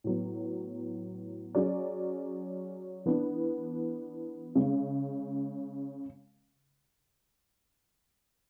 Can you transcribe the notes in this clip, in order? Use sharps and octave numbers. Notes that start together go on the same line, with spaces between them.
A2 F#3 B3
F#3 C#4 G#4 D5
E3 B3 D4
C#3 G#3 C#4